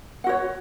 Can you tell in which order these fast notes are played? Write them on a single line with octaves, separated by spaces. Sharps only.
F#5 F#4 C#5